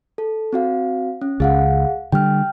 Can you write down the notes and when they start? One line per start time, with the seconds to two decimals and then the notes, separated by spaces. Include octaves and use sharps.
0.18 A4
0.53 C4 F#4 F5
1.22 C#4
1.40 C#2 G#4 F5 F#5
2.12 D3 G3 G5 F6